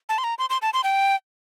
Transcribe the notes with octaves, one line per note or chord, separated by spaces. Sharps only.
A5
C6
A#5
C6
C6
A5
C6
G5